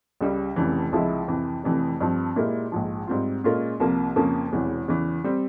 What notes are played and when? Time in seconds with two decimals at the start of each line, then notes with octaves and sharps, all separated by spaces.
0.21 C#2 C#3 G3
0.56 F1 F2 C#3 E3
0.92 C#2 C3 F3 G#3 E4
1.28 F2 C3 E3
1.64 F1 F2 C3 E3
2.01 G2 F3 C4
2.36 A#2 G#3 E4 G4 A#4
2.72 A#1 G#2 F3
3.07 G#2 G3 C4 F4
3.44 A#2 G#3 C#4 F4 A#4
3.80 C2 C3 F3 A#3
4.16 F2 C#3 F3 A#3 C#4
4.52 E1 E2 C3 E3
4.88 E2 C#3 E3
5.24 G3 C4